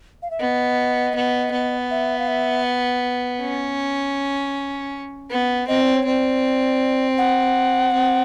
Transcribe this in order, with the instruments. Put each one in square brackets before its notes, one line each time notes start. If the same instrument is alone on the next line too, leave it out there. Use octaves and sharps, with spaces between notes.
[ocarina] F5
E5
[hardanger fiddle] B3 [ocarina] D#5
[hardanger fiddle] B3
B3
[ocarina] E5
F5
E5
[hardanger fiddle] C#4
B3
[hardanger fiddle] C4 [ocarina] D#5
[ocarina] D5
C#5
[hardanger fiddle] C4 [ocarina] D5
[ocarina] F#5
[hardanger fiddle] C4